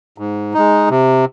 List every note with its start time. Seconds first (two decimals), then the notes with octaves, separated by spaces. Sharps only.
0.18 G#2
0.54 G#3 D#4
0.90 C3